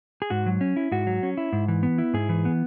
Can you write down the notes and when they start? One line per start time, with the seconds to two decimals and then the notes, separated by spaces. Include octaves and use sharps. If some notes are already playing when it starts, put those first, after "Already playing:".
0.22 G#4
0.30 G#2 F#4
0.46 F#3
0.61 C#4
0.76 E4
0.92 G#2 F#4
1.07 F#3
1.23 C#4
1.37 E4
1.53 G#2
1.68 E3
1.83 B3
1.98 E4
2.13 G#2 G#4
2.29 E3
2.45 B3